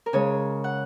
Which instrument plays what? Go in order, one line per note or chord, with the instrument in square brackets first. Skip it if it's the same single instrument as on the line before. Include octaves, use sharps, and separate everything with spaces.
[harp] A#4
C#3 G#3 C#5
F#5